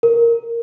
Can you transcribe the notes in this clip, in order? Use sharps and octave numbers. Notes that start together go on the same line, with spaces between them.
A#4